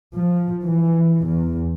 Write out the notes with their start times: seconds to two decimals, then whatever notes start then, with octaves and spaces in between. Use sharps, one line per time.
0.14 F3
0.64 E3
1.27 E2